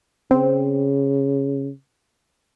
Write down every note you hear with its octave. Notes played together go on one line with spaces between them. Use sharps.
C#3 C4